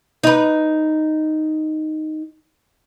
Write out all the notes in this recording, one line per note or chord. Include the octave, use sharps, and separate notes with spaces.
D#4 B4